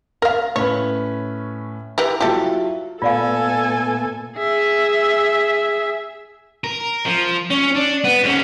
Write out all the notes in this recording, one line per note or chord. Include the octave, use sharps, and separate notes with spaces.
A#4 F5 F6
A2 C#4 B4 C#5
E3 G4 A#4
F#3 E4 F4 G4 A4
A#2 A3 B3 F4 A4 D5 F5 G#5
G#4 E5
A#4
F3
C#4
D4
B3
G#2 C#4